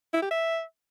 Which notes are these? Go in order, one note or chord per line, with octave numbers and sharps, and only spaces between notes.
E4
G4
E5